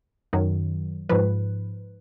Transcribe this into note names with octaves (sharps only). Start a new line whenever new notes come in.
F#2 D#3 F#3
G#2 F3 B4